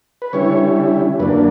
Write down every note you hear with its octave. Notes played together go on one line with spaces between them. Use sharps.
B4
D3 G3 C#4 E4 C#5
F#2 D3 A#3 D4 B4